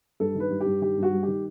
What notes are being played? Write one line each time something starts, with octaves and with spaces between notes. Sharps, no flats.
G2 A4
D#3
B4
G2
G4
G2
D#3 G4
G2
F#4
G3
D#3 G4